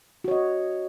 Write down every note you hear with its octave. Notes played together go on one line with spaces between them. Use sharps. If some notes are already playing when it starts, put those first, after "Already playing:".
F#4 C#5 D#5